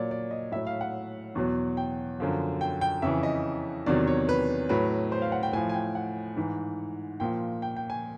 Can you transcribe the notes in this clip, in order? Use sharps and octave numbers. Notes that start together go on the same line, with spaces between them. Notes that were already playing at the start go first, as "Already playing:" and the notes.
Already playing: A#2 F#3 C#5 D5
D5
D#5
A2 F#3 E5
F5
F#5
E2 B2 F#3
G5
F#2 D3 F3
G5
G5
F2 C#3 E3 E5
D#5
E2 C3 D#3 F#3 D5
C#5
B4
A2 F#3 B4
C5
F5
F#5
G5
A2 F3 G#5
G#5
G5
F#5
G#2 E3
A#2 F3 G5
G5
G5
G#5